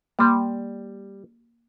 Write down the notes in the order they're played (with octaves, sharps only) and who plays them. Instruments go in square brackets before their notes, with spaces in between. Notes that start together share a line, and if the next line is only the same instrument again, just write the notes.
[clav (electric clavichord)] G3 [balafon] A#3 C6